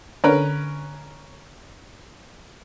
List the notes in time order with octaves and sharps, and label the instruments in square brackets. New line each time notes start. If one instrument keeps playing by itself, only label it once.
[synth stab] D3 [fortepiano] C#4 A#4 B4